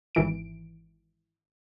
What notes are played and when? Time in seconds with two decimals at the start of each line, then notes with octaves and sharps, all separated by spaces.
0.15 G#1 E3 D7